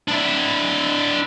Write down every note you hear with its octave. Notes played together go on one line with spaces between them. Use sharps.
D4 E4